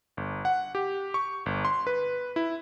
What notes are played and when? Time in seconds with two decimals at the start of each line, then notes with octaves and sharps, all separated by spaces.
0.17 G1
0.45 F#5
0.75 G4
1.14 C#6
1.46 G1
1.65 C6
1.87 B4
2.36 E4